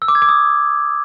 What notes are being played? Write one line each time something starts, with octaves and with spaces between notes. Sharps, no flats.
E6
D6
G#6
D6
D#6